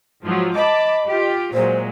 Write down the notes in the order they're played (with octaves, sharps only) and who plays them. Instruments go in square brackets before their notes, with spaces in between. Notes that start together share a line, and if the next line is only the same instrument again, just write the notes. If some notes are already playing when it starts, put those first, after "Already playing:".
[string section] G#2 F3 F#3
[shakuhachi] D#5 [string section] A5 B5 D6
[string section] F4 G4
[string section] A#2 F#3 G#3 [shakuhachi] C5